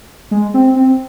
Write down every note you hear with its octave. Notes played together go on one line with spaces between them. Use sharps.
G#3
C4
C4